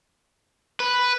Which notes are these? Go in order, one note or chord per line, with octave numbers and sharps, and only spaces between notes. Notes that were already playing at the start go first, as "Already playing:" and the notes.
B4